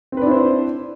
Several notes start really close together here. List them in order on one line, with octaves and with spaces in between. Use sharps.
C4 B4 D4 E4 C5